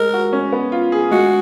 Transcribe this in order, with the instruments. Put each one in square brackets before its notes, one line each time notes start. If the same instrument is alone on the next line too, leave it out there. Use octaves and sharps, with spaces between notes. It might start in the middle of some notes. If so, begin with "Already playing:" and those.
Already playing: [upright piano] G#3 [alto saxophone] A#4
[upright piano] F#4
C#4
B3
F4
G#4
[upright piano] G#3 [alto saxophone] F#4